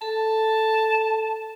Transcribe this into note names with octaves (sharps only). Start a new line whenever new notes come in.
A4 A5